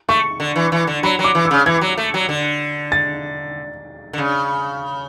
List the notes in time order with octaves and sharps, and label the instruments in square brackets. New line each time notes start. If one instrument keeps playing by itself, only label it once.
[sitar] A3 [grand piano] C#6
[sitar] D3
E3
E3
D3
[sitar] F#3 [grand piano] B5
[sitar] F#3
[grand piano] D6
[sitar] E3
[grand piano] E6
[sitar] C#3
[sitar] E3 [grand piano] G#6
[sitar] F#3
A3
F#3
D3
[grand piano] A6
[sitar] D3
C#3